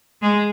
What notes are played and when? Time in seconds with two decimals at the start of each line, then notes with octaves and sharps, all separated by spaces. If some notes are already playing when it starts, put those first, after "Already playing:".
0.22 G#3